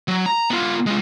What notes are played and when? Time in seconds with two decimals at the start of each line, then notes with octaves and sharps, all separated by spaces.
0.08 F#3
0.26 A#5
0.50 B3 F4
0.86 G#3 F4